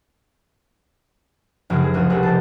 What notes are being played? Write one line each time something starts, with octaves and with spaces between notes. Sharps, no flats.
F1 F#2 C#3 F#4
G#4
C#2 F3 F#4 D#6
F1 C2 C3 G3 F#5
D#4 C5 A5